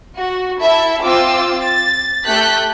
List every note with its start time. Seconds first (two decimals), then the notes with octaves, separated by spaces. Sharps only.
0.15 F#4
0.61 E4 A4 E5
1.03 C4 F4 D6 E6
1.63 A6
2.26 A3 G4 A4 F#6 G6 B6